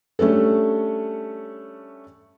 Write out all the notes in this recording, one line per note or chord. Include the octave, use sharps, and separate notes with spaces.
G3 A3 C#4 D4 A4